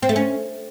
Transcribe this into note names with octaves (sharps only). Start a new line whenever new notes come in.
C4
A3
C#4